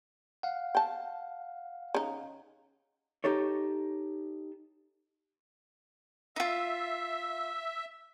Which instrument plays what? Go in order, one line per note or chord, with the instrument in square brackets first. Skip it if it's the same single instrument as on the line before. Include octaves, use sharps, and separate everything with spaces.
[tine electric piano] F5 F#5
[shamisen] G5 A5
C#3 D#4
[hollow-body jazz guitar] D#4 G4 A4 C#5
[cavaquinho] D#4 F4 [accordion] E5